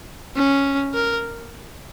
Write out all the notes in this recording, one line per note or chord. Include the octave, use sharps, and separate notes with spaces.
C#4
A#4